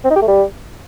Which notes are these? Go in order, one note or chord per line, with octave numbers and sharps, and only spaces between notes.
C4
D#4
G4
A3
G3